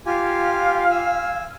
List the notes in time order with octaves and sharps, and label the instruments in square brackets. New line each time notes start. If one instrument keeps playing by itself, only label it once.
[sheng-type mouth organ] F4 G4 G#5 [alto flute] F5
[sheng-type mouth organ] G#5 E6